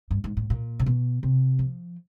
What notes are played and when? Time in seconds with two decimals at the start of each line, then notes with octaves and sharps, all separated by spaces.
0.11 G2
0.24 G#2
0.37 A2
0.50 A#2
0.79 C3
0.86 B2
1.23 C3
1.59 F3